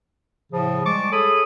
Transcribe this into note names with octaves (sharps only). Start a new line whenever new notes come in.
A2 C#3 F3
G3 G#3 A5 C#6 D6
G#4 A4 C#5 B5 D#6